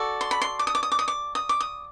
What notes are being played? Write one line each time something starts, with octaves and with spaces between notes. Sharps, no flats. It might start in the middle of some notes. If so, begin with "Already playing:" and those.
Already playing: F#4 A4 D5
C6
B5
C6
D6
D#6
D6
D#6
D6
D#6
D6
D#6
D6
D#6